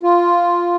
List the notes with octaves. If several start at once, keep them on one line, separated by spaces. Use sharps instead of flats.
F4